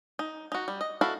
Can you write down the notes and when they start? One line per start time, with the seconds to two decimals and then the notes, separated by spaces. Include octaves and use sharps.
0.19 D#4
0.52 D#4 F#4
0.68 G3
0.81 D#5
1.01 E4 F#4 A4 F5